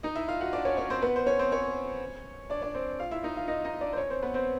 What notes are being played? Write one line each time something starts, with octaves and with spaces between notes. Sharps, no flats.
D#4 D#5
E4 E5
F4 F5
F#4 F#5
D4 D5
C#4 C#5
C#4 C#5
C4 C5
B3 B4
C5
C#4 C#5
C4 C5
C#4 C#5
D4 D5
D4 D5
C4 C5
F4 F5
E4 E5
D#4 D#5
F4 F5
D#4 D#5
D#4 D#5
D4 D5
C5
C#4 C#5
C4 C5
B3 B4
C4 C5